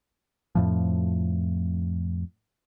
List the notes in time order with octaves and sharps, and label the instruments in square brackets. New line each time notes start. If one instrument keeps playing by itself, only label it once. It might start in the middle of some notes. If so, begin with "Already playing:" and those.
[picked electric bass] F2 A2 F3